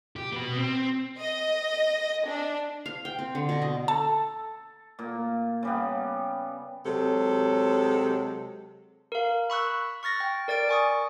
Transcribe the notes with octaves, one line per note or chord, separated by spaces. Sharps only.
G4
B2 B3
C4
D#5
D4
F5
G5
C4
D3
B2
D#5
A4 A5
A#2 A#3
C#3 G3 B3
C3 F#3 G#3 A4
A#4 F5
B5 C#6 E6 F#6
C#6 F6 A6 A#6
G5
A#4 D5 A6 D7
G#5 C#6 D#6